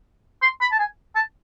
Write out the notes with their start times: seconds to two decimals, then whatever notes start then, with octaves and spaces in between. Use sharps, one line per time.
0.42 C6
0.61 B5
0.72 A5
0.79 G#5
1.16 A5